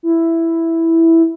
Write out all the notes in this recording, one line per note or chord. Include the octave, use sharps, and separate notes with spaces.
E4